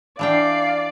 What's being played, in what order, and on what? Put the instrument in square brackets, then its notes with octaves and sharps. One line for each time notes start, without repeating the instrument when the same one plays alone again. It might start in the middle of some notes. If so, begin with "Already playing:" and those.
[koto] E3 D4 G5 [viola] D5 [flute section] F5